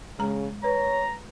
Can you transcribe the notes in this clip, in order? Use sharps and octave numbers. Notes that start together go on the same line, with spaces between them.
C#3 G#3 A#5
B4 C#5 A#5